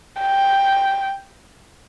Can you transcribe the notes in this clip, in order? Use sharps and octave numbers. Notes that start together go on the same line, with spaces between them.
G5